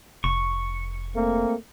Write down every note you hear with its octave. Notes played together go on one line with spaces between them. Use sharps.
F1 C#6
A3 A#3 C4